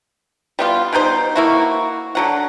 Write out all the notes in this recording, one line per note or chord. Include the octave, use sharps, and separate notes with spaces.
G3 B3 F4
B2 G3 D#4 C5
A#3 E4 F#4
D3 F#3 F#5